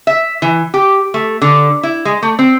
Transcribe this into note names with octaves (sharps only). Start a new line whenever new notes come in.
E5
E3
G4
A3
D3
E4
G#3
A3
C4